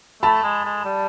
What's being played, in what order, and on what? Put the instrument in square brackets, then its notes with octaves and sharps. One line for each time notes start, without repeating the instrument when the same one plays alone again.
[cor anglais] A3 [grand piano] A5 B5
[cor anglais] G#3
G#3
G3